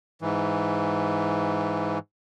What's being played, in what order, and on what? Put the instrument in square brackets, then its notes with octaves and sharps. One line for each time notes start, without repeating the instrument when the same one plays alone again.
[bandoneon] G#2 E3